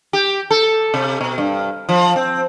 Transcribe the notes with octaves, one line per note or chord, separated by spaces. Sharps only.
G4
A4
C3
B2
G2
F3
C4